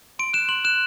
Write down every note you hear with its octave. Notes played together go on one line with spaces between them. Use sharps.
C6 D7
F#6 E7
C6 F#7
F#6 E7